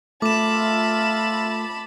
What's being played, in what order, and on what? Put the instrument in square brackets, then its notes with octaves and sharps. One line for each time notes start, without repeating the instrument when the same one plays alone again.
[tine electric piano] A3 [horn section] F4 E5 [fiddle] A5 B5 [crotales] D6 E7